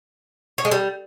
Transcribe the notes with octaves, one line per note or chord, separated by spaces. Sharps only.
C#5
G#3
G3